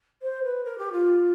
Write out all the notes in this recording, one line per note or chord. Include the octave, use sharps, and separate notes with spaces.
C5
B4
A#4
G4
F4